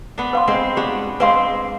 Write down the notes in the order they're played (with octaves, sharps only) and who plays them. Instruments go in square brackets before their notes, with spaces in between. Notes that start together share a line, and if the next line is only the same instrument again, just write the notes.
[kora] B3 D4
[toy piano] B4 F5 C6
[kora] G#3 C4
[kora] B3 D4 [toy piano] G4
[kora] G#3 C4 [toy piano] B4 F5 C6